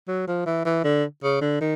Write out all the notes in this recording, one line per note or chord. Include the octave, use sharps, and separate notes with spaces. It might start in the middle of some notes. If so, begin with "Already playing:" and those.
F#3
F3
E3
E3
D3
C#3
D3
D#3